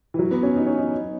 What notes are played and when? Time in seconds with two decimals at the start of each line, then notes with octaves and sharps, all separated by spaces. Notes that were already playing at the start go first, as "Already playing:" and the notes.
0.14 E3
0.19 F#3
0.31 B3
0.43 C#4
0.56 D#4
0.66 C#4
0.78 D#4